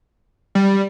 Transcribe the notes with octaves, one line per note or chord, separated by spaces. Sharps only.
G3